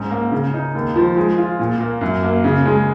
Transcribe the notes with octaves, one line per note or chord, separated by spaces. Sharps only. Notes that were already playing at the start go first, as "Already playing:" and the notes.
Already playing: G#2 C#4
A#3
C#3
D#4
D#2
F3
G#3
F4
A#2
A#3
F#2
A#3
C#3
G#3